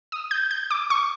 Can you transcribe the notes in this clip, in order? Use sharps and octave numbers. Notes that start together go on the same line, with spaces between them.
D#6
G6
G6
D6
C#6